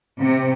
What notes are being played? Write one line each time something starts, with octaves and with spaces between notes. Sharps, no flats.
C3